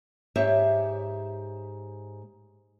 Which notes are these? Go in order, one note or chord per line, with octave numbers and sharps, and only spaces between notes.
G#2 G4 C#5 E5